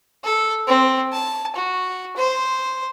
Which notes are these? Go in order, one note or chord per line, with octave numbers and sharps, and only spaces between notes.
A4
C4
A5
F#4
C5